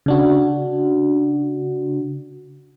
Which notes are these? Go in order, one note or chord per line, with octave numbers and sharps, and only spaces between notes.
C#3 D4 F#4